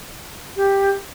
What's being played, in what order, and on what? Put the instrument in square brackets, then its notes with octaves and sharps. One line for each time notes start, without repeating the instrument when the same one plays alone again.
[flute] G4